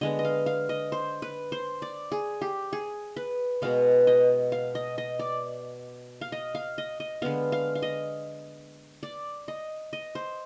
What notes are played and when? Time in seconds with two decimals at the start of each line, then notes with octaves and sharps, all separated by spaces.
0.01 D3 G#3 B3 D#5
0.19 D#5
0.25 F5
0.46 F5
0.69 D#5
0.92 C5
1.22 B4
1.52 C5
1.82 D5
2.12 G#4
2.41 G4
2.73 G#4
3.16 B4
3.62 B2 G#3 B3 F5
4.07 D#5
4.52 F5
4.75 D#5
4.98 D#5
5.19 D5
6.21 F5
6.32 D#5
6.55 F5
6.78 D#5
7.00 D#5
7.22 D3 G#3 B3 F5
7.52 F5
7.75 F5
7.82 D#5
9.03 D5
9.48 D#5
9.93 D#5
10.15 C5